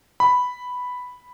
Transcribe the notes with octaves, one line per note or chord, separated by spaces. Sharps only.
B5